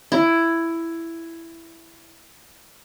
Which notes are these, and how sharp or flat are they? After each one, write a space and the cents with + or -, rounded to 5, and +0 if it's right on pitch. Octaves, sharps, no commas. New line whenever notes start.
E4 +10